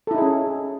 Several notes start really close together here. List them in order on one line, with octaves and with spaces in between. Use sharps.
A4 E4 D#4 G#4 C#4